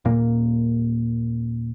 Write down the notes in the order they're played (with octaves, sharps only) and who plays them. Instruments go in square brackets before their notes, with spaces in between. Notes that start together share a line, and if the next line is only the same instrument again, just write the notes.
[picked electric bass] D#1 A#2 A#3